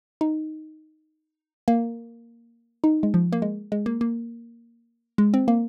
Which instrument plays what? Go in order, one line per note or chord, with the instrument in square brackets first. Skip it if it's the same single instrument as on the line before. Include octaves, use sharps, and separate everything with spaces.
[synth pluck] D#4
A#3
D#4
G#3
F3
A#3
G#3
G#3
A#3
A#3
G#3
C4
A#3